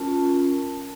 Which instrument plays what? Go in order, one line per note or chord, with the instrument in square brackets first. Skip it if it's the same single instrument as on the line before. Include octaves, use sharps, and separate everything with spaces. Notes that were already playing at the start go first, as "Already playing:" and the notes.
Already playing: [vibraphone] C#4 F4 A#4 [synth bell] A5